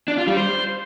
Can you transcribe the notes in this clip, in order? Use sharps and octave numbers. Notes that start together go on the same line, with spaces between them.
D4
F4
G3
C5